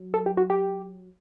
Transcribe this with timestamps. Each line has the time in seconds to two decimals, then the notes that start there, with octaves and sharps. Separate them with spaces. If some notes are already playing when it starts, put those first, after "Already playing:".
Already playing: F#3
0.14 A4
0.26 G4
0.37 F#4
0.50 G4